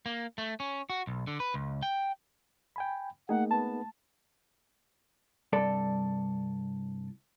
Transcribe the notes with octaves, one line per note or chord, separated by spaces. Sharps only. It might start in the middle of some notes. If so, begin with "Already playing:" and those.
A#3
A3
C#4
F#4
B1
D3
B4
C#2
G5
G5 G#5 B5
A3 A#3 D#4 G#4 F#5
B3 A5
C2 G2 A4 D5